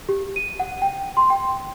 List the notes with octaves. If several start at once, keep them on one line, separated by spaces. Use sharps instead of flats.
G4
D#7
F#5
G5
C6
G5